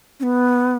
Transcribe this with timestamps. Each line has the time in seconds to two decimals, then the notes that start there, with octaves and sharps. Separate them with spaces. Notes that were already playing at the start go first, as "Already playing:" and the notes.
0.20 C#4
0.23 B3